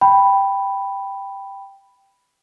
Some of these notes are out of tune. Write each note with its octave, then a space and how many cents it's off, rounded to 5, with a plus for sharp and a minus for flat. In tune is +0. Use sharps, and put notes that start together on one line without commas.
G5 +0 B5 +0